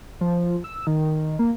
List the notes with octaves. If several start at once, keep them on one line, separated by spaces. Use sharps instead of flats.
F3
E6
D#3
A#3